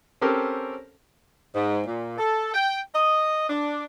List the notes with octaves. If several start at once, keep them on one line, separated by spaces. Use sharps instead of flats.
C4 C#4 G4 A4 A#4
G#2
A#2
A4
G5
D#5
D4